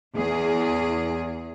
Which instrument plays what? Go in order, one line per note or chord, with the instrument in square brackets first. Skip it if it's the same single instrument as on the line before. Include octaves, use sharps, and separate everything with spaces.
[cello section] E2 G#4